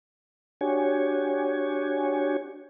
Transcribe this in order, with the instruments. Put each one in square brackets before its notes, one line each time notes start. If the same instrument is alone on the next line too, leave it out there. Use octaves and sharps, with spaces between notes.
[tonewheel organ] D4 F#4 G4 C#5 G#5